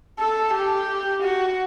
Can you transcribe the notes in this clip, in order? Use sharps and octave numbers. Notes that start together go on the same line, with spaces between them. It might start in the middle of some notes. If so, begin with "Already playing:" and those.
A4
G4
F#4